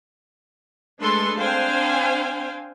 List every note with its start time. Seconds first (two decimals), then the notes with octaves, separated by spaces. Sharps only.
1.01 G#3 A3 D4 A4 B4 C6
1.40 C4 D4 C5 F5 G5 G#5